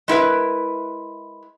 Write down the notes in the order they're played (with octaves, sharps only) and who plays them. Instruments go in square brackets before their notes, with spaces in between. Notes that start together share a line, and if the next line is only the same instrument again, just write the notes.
[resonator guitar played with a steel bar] G#3 E4 A#4 B4